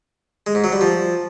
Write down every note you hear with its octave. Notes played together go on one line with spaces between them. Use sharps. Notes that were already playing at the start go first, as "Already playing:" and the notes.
G#3
G#2
F#3
G3
F3